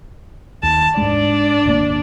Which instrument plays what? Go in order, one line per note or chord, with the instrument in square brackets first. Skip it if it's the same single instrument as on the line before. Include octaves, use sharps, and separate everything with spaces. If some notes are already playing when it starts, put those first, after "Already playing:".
[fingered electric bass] D#2 [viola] A5
[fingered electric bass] G#2 G#3 [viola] D4 D5
[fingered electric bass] D#1 G#1 A#3